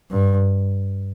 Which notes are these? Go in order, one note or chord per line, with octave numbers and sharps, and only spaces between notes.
G2